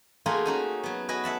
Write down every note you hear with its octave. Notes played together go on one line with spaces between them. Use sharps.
A3 A#3 D#4 F4 F#4 G#4
C#4 D#4 F#4
F#3 B3
F#4 B4 D#5 G#5
E5 F#5 A5 B5